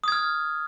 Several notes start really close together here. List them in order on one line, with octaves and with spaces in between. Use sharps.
D#6 G#6 F6